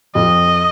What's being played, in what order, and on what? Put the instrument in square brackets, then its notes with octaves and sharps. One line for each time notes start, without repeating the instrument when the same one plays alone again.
[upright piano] F2 [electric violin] D#5